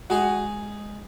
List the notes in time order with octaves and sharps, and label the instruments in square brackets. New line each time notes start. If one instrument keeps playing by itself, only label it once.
[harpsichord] G#3 D#4 G#4 D#5 [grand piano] F#4 F#5